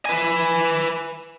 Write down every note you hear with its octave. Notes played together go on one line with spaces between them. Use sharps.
B4 G#5